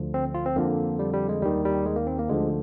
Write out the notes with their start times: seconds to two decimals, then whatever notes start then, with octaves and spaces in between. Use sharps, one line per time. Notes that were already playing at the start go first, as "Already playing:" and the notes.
Already playing: D2 D3 F3
0.14 C4
0.34 F4
0.46 C4
0.56 F2 D3 F3 A#3
0.99 G3
1.13 G3
1.29 G#3
1.42 D#2 D#3 G3
1.65 G3
1.86 G#3
1.96 A#3
2.07 C4
2.19 A#3
2.29 D2 D3 F3 G#3